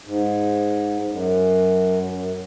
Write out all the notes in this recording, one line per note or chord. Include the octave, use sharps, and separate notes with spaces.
G#2
F#2
F#2